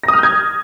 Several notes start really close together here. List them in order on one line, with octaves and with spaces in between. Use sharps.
A#6 D#6 F6 G6 G#6